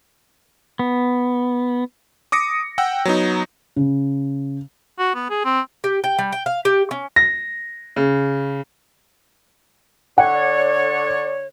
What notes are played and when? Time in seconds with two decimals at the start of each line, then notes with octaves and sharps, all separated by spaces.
0.79 B3
2.32 D6 D#6 A#6 C#7
2.78 F#5 G5 E6
3.05 F#3 B3 D#4
3.76 C#3
4.99 F#4
5.15 B3
5.30 G#4
5.45 C4
5.84 G4
6.04 G5
6.18 G3
6.32 G5
6.46 F5
6.65 G4
6.91 C#4
7.16 A#6
7.96 C#3
10.18 D3 C#5 F#5
10.35 D5